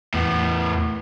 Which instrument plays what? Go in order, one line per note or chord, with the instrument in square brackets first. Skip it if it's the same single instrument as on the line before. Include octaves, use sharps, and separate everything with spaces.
[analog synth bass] E2 [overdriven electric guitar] A2 B3